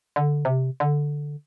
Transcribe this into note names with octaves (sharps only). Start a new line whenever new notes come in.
D3
C3
D3